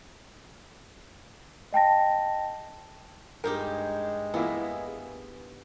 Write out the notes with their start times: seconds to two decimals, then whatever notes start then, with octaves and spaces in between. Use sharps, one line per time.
1.73 D#5 G5 A5 A#6
3.44 G2 G#3 D#4 G4 A#4
4.34 E3 A#3 B3 E4